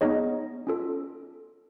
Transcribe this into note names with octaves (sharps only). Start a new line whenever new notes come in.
B3 D#4 G#4 C#5 D#5
C#4 F4 A4